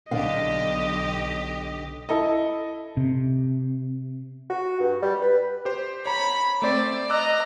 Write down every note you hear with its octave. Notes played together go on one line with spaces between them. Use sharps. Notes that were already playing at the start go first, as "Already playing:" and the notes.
B1 D3 D4 G4 D#5 F5
E4 A4 D#5
C3
F#4
G2
G3
B4
G4 C5
C#5 A#5 B5
A3 C4 C5 D5
D#5 A#5 D6 E6 F#6